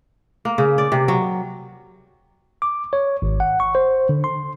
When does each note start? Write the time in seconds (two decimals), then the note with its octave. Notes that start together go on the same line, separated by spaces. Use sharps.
0.45 A#3
0.58 C#3
0.78 D5
0.92 C3
1.08 F#3
2.62 D6
2.93 C#5
3.22 G#1
3.40 F#5
3.60 C#6
3.75 C5
4.09 D3
4.24 C6